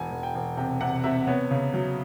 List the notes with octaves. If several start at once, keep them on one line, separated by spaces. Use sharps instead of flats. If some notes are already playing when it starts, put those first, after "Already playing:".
Already playing: E1 G#5
E1
G5
E1
C3 G5
C3 F#5
C3 E5
B3 C#5
C#3
F#3